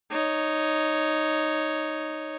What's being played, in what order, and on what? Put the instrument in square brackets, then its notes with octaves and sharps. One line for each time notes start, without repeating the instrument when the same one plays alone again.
[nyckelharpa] D#4 C#5